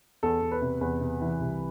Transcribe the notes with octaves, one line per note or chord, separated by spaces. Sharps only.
E2 A4
E2
B4
C3
E2 B4
C3
E3
C2